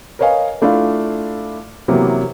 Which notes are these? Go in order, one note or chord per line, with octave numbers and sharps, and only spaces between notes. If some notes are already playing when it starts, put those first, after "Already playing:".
A#4 B4 C#5 D#5 F5 G#5
A3 D4 E4 F4 F5
C3 E3 F#3 A#3 B3 G4